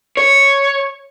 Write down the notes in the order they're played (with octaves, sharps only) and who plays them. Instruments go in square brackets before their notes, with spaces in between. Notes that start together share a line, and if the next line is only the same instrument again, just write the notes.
[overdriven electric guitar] C#5